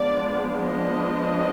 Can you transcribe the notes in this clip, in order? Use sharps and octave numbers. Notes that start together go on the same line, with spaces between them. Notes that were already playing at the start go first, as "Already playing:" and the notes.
Already playing: F3 G#3 B3 D4 D5
D#5